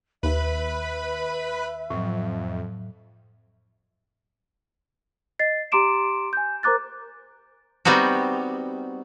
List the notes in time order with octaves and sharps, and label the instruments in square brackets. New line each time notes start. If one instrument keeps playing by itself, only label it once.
[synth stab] D#2 [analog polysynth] B4 B5 [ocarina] E5
[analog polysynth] F2 [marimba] A2 F#3
[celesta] D#5 A6 C7
G4 A#5 C6 D6 D7 E7
G#5 G6
A#4 C5 A#5 D6 F#6 A6
[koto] G3 B3 C4 D#4 F#4